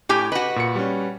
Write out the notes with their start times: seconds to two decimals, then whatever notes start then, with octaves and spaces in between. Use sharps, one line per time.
0.09 A2 G4 G#5
0.32 F#4 B4 D#5
0.56 A#2 C#7
0.75 G3 C#4